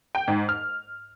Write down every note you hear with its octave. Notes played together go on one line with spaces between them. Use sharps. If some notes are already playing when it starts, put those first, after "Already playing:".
G5
G#2
F6